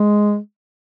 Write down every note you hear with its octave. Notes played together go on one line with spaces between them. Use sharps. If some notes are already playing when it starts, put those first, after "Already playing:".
Already playing: G#3